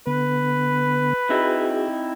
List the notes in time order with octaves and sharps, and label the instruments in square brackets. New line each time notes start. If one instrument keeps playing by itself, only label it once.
[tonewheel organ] D3 B3 [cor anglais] B4
[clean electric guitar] C4 D#4 E4 [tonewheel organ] F#4 G#4